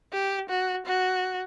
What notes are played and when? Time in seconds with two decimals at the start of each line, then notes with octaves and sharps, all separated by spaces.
0.13 G4
0.49 F#4
0.86 F#4